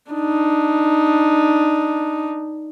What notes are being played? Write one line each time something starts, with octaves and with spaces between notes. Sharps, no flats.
D4 D#4